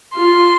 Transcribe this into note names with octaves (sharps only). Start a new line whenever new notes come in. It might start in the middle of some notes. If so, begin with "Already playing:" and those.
F4 C6